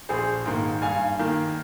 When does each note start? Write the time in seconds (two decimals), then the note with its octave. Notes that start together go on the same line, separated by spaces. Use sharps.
0.09 A#1 G#4 C5
0.46 G#2 D#3 A#3
0.82 G2 F5 G#5
1.19 D#3 A#3